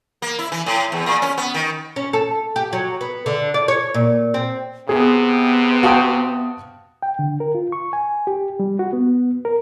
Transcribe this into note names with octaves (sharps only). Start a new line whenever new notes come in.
A#3
E4
E3
A2
E2
A#2
C#4
B3
D#3
C#4
A4
G4
F#3
B3
D3
D5
C#5
A#2
C4
C3 B3 G#4
F#4 F5 G5 A5 D#6
G5
D3
A#4
F4
C#6
G#5
G4
G3
F#4
B3
A#4